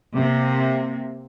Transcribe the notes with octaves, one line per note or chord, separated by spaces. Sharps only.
C3 A#3